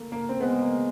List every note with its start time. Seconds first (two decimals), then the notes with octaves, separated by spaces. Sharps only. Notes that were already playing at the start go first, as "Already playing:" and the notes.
Already playing: A3 A#3
0.12 A#3
0.29 C4
0.40 G#3 B3
0.62 A#3